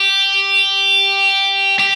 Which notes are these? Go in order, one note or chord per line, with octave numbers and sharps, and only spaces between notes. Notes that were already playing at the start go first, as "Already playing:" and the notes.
Already playing: G4
G4